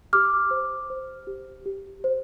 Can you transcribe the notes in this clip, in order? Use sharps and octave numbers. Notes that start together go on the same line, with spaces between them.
G4 D6 F6
C5
C5
G4
G4
C5